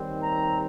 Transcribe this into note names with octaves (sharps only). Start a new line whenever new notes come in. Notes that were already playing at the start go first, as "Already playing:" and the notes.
Already playing: D#2 D#3 G3 C4
A#5